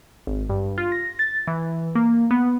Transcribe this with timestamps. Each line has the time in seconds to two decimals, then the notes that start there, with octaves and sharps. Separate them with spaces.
0.27 G#1
0.50 G2
0.78 F4
0.92 A#6
1.19 A6
1.47 E3
1.95 A#3
2.31 B3